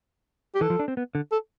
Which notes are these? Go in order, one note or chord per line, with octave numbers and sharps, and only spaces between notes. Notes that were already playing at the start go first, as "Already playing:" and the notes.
G4
E3 A4
F3
D4
C4
B3
D3
A4